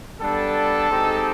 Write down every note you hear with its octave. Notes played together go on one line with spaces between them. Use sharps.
G3 B3 D4 A4
G#3 C4 D#4 G4